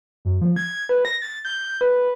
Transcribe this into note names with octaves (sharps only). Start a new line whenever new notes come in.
F#2
F3
G#6
B4
A#6
A6
G6
B4